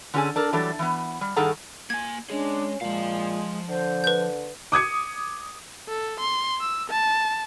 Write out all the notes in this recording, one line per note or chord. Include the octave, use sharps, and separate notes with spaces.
D3 C#4 F#4 G#4 A4 G#5
D4 A4 A#4
E3 F#3 G3 D4 A4
E3 B3
G3
G2 D#3 G#4 A4 F#5 A#5
A#3 G#5 G#6
G#3 C#4 D4 G#4
A#2 F3 G#3 F5
D3 C5
B4 G6
D6 D#6 G#6 C#7
A4
C6
E6
A5